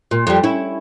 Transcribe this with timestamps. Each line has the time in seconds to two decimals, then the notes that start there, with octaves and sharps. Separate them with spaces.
0.11 A#2
0.27 F2 G3
0.43 C#4 E4